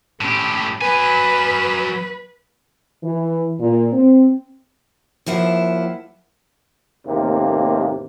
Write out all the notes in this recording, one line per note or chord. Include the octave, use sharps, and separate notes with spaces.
A2 C#4 G4
F#3 B4 G#5
E3
A#2
C4
D#2 F3 E4 F#5
A1 D#2 C3 A#3